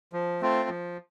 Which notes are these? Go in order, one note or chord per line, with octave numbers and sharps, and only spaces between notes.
F3
A3 C4 F4
F3